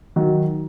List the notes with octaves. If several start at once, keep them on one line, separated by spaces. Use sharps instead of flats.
D#3 F#3